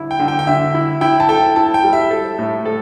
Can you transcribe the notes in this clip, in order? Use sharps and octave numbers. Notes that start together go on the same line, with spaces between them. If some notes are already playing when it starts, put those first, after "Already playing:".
Already playing: D3 E4
G5
D3
G5
G5
D3 E5
E4
E4 G5
A5
A4 G5
E4 A5
G5
G3
E5
A4
A2
A4